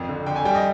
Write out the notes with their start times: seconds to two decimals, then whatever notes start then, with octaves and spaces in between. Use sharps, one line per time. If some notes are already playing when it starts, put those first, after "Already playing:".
Already playing: G#1 F2
0.09 D3
0.26 D3 G5
0.36 G#5
0.45 G3 G5
0.55 D#5